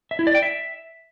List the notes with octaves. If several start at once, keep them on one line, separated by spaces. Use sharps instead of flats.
E5
E4
D5
G5
E5